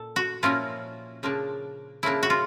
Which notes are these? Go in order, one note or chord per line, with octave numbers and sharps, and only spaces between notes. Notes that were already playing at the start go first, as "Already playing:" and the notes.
Already playing: A#2 A4
F#4
A#2 F3 A#3 C#4 E4 F4
C#3 F3 A#3 D4
C#3 F3 A#3 D4 E4
F#4
F4